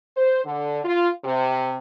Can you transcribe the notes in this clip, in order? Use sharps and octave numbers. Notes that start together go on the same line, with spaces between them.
C5
D3
F4
C3